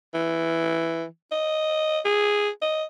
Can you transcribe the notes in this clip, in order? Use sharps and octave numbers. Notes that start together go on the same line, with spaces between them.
E3
D#5
G#4
D#5